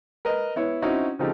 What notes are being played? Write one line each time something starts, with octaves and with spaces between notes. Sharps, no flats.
A#4 B4 D#5
B3 E4 C#5
C4 C#4 D#4 E4 F#4
C#3 F3 C4 D#4 G4 A4